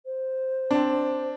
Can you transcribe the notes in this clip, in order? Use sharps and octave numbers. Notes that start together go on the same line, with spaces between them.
C5
C4 D4